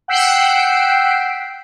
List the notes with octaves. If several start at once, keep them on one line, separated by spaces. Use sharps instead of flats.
F#5 G5 E6 B6 C7 D7